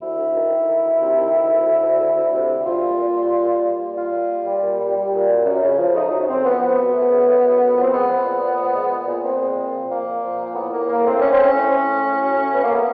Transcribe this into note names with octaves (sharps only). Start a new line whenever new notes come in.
D2 E4
D2
D#3
D#3
D#3
D2
C3
D#3
D2
D2
D2
D2
D2
D2
C3
D2
G3 F4
A#2
A#2
G3
A#2
G3
G3
A#2
G3 F4
A#2
G3
G3
A#2
G3
G3
A#2
F#2
F#2
C#3
F3
A3 D#4
F#2
C#3 C4
F3 B3
F3 B3
F#2
A3
C#3
A3
F#2
F#2
F3
C4
G#3 B3
F3
A#2
A#2
F3
G#3
A#2
A#2
A#2 C4
G#3
A#2
F3
A#2 A#3
A#2
F3
A#2
A2 B3
A2 A#3
A2 A#3
A3 C4
A3 C#4
C4
A3 C#4
A2
A2
A3
A2
F#3
A3
F#3 B3
A#3
A3 B3